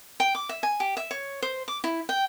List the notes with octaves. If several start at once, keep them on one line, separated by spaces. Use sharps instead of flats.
G5
D6
E5
G#5
G4
E5
C#5
C5
D6
E4
G5